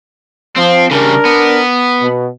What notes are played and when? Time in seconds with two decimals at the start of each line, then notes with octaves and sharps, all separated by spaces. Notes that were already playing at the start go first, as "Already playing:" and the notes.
0.56 F3 C4
0.91 C#3 G3 D4 A#4
1.25 B3
2.00 B2